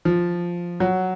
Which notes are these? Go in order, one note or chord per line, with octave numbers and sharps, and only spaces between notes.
F3
F#3